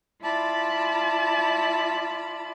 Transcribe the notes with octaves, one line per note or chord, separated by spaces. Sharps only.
E4 F4 D5 A5 B5